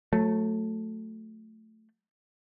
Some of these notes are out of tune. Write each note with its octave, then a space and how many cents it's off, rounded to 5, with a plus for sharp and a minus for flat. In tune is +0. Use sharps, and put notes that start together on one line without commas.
F#3 -25 A3 +0